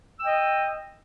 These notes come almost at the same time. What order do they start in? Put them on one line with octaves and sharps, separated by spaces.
E6 G5 D#5